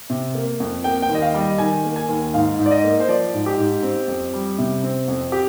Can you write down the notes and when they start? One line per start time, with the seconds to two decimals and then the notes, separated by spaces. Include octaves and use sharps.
0.10 C3
0.35 A#3
0.60 F2
0.84 A#3 G5
1.02 G5
1.09 D#2
1.15 D#5
1.22 F5
1.34 G3
1.41 D#5
1.58 D#3 G#5
1.84 A#3
1.96 G#5
2.09 D#2
2.34 G#2 F5
2.59 G#2
2.66 D5
2.71 D#5
2.84 A#3
3.00 C5
3.08 F3 D5
3.33 G#2
3.46 G4
3.58 G#2
3.83 C4
4.08 F2
4.33 G3
4.58 C3
4.83 C4
5.08 F2
5.32 G4